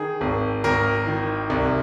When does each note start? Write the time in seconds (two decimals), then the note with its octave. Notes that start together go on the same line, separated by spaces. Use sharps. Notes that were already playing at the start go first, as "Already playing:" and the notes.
Already playing: D#3 G#4
0.21 G#1
0.64 G#1 A#4
1.07 D#3
1.50 C2